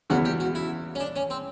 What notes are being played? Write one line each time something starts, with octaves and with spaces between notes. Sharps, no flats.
E2 C#3 E3 G#3 B3 F#4
G4
F#4
E4
C#4
D4
C#4
C4